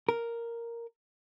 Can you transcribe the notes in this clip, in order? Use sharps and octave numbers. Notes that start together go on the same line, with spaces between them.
A#4